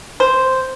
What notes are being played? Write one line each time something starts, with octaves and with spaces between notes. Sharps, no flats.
C5